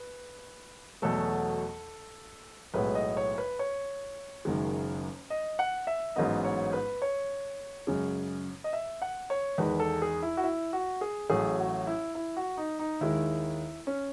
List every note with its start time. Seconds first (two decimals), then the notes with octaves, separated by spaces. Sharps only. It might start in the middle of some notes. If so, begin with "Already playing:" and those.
Already playing: B4
1.02 E2 B2 F#3 A3 A4
2.74 B1 A2 G#3 B3 B4
2.95 D#5
3.17 C#5
3.38 B4
3.59 C#5
4.45 F#1 F#2 D#3 G#3
5.30 D#5
5.59 F#5
5.87 E5
6.16 A1 G#2 F#3 B3 D#5
6.45 C#5
6.73 B4
7.02 C#5
7.87 F#2 C#3 G#3
8.64 D#5
8.73 E5
9.02 F#5
9.30 C#5
9.58 E2 D#3 G#3 B4
9.80 A4
10.02 G#4
10.23 E4
10.37 F#4
10.44 E4
10.73 F#4
11.01 G#4
11.30 A1 A2 F#3 G#4
11.59 F#4
11.87 E4
12.15 E4
12.36 F#4
12.57 D#4
12.79 D#4
13.01 D#2 D#3 G#3 E4
13.87 C#4